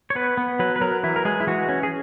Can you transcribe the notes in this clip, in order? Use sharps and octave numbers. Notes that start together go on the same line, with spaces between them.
C#5
B3 B4
B3
F#3 B4
B4
F#3 A#4
E3 E4
A#4
G#3 G#4
E4
E3 F#4
C#4
G#4